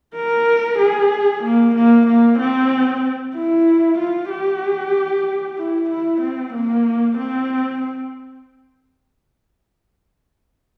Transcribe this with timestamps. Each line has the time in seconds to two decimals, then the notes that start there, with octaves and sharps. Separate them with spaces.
0.16 A#4
0.79 G#4
1.44 A#3
1.75 A#3
2.07 A#3
2.39 C4
3.35 E4
3.99 F4
4.30 G4
5.57 E4
5.89 E4
6.21 C4
6.53 A#3
7.17 C4